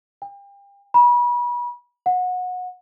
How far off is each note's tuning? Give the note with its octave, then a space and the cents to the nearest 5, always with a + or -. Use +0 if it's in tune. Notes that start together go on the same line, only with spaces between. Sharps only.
G5 +35
B5 -35
F#5 -25